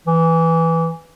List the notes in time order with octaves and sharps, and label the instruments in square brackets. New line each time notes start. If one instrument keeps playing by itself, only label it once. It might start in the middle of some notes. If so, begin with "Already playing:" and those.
[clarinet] E3